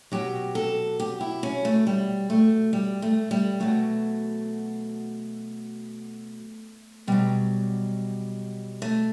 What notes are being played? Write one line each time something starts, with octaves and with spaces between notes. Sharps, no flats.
B2 F#3 G4
A4
G4
E4
C#4
A3
G3
A3
G3
A3
G3
B2 F#3 A3
B2 F#3 G3
A3